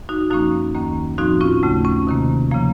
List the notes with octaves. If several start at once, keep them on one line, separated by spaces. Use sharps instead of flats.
D#4 F#4
F#2 F3 A#3 C#4 D#4 F#4
D#2 D#3 A#3 C#4
A2 F3 C4 D#4 F#4
C#4 F4
D#2 C#3 A3
C#4
C3 D#3 A#3
C#3 F3 A#3